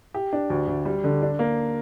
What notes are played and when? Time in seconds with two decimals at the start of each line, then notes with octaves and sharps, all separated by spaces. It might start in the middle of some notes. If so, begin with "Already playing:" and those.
0.14 G4
0.33 D4
0.50 D2
0.67 D2
0.85 G3
1.04 D3
1.22 D4
1.39 A#3